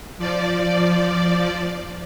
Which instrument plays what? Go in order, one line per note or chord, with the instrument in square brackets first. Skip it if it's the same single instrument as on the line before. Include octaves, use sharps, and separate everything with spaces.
[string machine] F3 D5